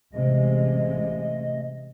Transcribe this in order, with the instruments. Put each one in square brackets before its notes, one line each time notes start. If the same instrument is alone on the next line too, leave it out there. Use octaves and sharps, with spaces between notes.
[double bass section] A1 C3 G#3 [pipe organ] A3 D#5